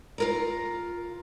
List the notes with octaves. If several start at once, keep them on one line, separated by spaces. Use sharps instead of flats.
F4 A#4 A#5